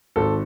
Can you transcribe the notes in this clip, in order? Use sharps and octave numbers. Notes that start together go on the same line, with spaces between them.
G#1 A4